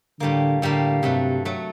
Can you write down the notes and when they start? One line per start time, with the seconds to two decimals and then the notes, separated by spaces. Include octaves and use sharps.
0.20 A2 D3 G3 A#3
0.62 A2 D3 G3 A#3
1.03 G2 C3 F#3 A3
1.45 F#3 A3